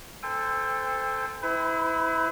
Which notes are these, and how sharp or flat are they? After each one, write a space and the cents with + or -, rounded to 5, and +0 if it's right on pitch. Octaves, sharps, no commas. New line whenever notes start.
A4 +0 C5 -20 G5 +35
E4 -20 B4 +45